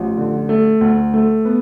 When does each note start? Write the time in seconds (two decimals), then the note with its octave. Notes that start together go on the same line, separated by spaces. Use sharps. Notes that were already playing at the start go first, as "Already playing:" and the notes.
Already playing: A1 F3
0.17 D3
0.49 A3
0.81 D2
1.14 A3
1.45 B3